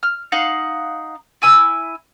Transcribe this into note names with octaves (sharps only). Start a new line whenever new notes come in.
F6
D#4 F5 F#5
E4 G#5 E6